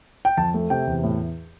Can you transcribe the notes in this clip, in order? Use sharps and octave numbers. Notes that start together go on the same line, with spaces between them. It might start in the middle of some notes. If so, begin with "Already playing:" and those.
G5
F2 A5
A3
C3 G5
E2
A2